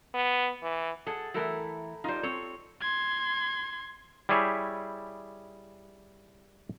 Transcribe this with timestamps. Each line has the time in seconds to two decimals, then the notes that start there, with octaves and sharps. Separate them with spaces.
0.14 B3
0.62 E3
1.07 G#4 A4 F#5
1.34 E3 A3 E4 A4 A#4
2.04 G3 D#4 F4 C5
2.23 C4 A4 C#5
2.81 C6 G#6
4.29 G3 E4 G4 G#4 C#5 E5